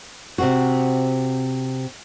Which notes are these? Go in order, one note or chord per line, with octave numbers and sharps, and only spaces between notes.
C3 C4 F#4